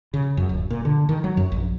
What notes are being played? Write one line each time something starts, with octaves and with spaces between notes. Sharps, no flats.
C#3
F#2
D1
A#2
D3
D#3
F#3
F#2
A#1